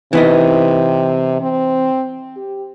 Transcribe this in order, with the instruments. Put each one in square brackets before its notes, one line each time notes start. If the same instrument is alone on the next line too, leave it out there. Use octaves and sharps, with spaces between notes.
[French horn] C3 [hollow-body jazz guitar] E3 B3 D#4
[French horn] C4
G4